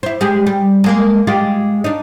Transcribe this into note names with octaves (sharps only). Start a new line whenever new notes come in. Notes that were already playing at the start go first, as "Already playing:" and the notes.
E4 C5
G#3 G4 G#4
G3
G#3 A#3
G#3 F4 G4
D4 D#4